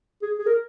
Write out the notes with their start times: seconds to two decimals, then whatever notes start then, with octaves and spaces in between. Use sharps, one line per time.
0.22 G#4
0.38 G#4
0.46 A#4